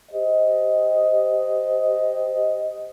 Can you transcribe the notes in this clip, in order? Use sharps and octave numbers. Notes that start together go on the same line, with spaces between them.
G4 C5 D#5